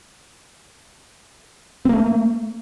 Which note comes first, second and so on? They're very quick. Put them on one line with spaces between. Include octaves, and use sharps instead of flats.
C4 A#3 A3